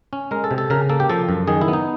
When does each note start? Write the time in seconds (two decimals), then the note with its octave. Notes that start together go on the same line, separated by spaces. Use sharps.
0.13 C#4
0.31 G#3 A#4
0.44 A4
0.51 C3
0.58 A4
0.70 C#3 A#4
0.89 A#3 A4
1.00 G4
1.09 F3 A4
1.29 F#2
1.47 D#3 G#4
1.61 E4
1.68 B3
1.73 D#4